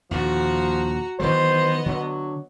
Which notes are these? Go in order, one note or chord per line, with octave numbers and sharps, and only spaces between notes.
D#2 A#2 D3 F3 F#4 A#5
D#3 E3 F#3 B3 C5 D#5
D3 F#3